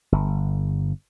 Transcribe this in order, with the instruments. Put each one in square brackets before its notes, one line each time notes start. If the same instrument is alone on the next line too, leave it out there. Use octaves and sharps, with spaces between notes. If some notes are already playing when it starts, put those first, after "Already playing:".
[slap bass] G1